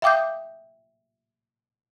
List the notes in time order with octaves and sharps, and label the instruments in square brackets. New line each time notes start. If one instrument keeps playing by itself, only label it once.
[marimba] E5 F5 G5 D6 D#6 G6